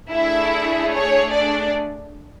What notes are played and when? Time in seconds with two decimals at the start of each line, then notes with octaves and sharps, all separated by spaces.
0.11 A3 D4 E4 G#4 E5
0.92 C#5
1.32 D4 D5